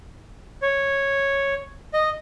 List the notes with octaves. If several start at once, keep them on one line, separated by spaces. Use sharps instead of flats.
C#5
D#5